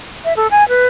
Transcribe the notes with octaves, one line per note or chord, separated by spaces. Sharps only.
E5
A4
G#5
B4